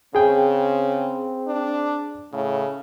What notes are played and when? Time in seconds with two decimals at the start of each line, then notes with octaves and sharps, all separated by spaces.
0.15 C#3 C4 G#4 G5
1.47 D4
2.33 A2 C#3